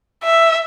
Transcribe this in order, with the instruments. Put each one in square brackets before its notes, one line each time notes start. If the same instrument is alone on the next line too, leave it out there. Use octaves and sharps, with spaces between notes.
[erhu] E5